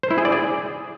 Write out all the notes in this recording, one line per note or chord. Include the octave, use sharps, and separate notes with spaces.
C5
E4
G#4
D5
G#4